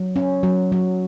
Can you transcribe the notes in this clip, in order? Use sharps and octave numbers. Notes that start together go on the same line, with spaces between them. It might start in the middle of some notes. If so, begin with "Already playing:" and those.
Already playing: F#3
C#4
F#3
F#3